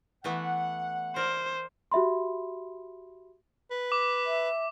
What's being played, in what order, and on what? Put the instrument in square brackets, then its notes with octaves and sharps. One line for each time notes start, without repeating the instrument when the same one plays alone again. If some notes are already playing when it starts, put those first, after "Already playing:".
[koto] E3 A3 B3 [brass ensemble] F#5
[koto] A#4 D5 [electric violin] C5
[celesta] F#4 G4 E5 B5 C6
[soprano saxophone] B4
[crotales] D6
[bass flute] E5